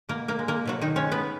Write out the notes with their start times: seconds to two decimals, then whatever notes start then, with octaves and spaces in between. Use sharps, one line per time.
0.09 B2 A#3 A#4
0.28 A#3 A#4
0.39 G#3
0.48 A#3 A#4
0.66 B2 F#3 F#4
0.81 D#3 D#4
0.96 G#3 C#4 C#5
1.12 B3 B4